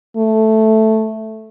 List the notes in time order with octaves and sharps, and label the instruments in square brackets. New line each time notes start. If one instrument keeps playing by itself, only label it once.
[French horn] A3